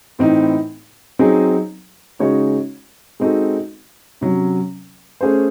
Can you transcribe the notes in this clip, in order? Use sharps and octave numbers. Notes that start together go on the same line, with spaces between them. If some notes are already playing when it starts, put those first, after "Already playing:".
A2 E3 C4 D#4
F#3 C4 D#4 G#4
C#3 G#3 D#4 F#4 C#5
G#3 C4 D#4 F#4 A4
C3 F#3 C#4
A3 C#4 G#4 C5